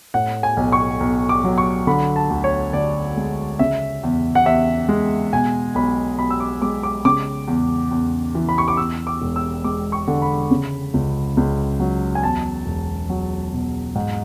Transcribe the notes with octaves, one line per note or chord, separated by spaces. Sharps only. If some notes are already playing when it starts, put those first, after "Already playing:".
A2 F#5
G#5
B1
C#6
B1
D6
F#3
C#6
D3 B5
A5
D2
C#5
D2 D5
G#3
C#3 E5
E2
F#5
E2 E5
G#3
B2 G#5
B1 B5
B1 B5
E6
D6
G#3 D6
D6
C#3 D6
E2
E2
E3
B5
C#6
D6
E2 E6
D6
E1
E6
G#3 D6
C#6
D3
B5
C#3
C#2
C#2
F#3
G#5
E2 A5
E1
F#3
B2
G#2